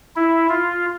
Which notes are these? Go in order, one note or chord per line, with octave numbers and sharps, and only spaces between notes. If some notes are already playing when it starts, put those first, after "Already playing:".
E4
F4